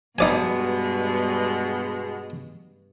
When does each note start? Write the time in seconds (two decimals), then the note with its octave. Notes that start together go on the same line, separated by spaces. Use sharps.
0.19 G2 B2 G#3 B3 D#4 D5 G#5